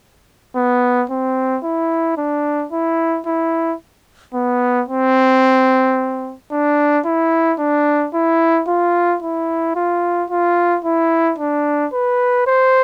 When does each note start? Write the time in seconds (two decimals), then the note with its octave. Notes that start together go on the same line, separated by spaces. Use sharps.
0.56 B3
1.10 C4
1.64 E4
2.18 D4
2.72 E4
3.26 E4
4.34 B3
4.89 C4
6.52 D4
7.06 E4
7.60 D4
8.14 E4
8.68 F4
9.22 E4
9.76 F4
10.30 F4
10.85 E4
11.38 D4
11.93 B4
12.47 C5